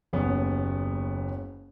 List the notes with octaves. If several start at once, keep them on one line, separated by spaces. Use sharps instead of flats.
F#1 D#2 B3 C#4